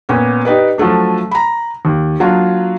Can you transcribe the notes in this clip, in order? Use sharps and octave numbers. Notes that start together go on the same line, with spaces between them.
A#2 B3 C#4
D#4 G4 B4 D5
F3 F#3 A3 D4
A#5 B5
D#2
F#3 A#3 D4 F4